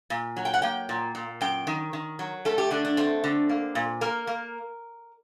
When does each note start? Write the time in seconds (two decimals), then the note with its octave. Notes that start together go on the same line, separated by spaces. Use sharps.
0.10 A#2
0.37 F#3
0.45 G5
0.54 F#5
0.62 A#3 G5
0.89 A#2
1.15 A#2
1.41 F#2 G5
1.67 D#3
1.93 D#3
2.19 F#3
2.45 A3 A4
2.58 G4
2.71 D3 D4
2.85 D4
2.97 A3 C4
3.24 D3
3.49 A#3
3.75 A#2
4.01 A#3 A#4
4.27 A#3